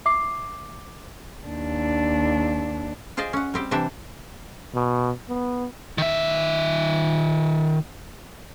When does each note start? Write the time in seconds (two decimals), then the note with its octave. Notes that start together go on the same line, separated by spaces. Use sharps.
0.05 E5 D6 C7
1.47 D#2 D4
3.17 F4 G#4 C5 D5 D#5 G#5
3.33 C#4 F#5
3.54 G3 C4 G4
3.71 C3 E3 D4 G4 C5 E5
4.74 B2
5.29 B3
5.98 D#3 E5